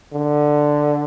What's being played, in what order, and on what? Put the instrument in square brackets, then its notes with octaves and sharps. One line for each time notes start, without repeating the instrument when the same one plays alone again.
[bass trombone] D3